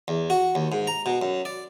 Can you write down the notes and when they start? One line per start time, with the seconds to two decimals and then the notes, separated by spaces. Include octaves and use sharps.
0.08 E2
0.30 F#4
0.55 D#2
0.72 G#2
0.87 A#5
1.06 B2
1.22 F#2
1.45 D5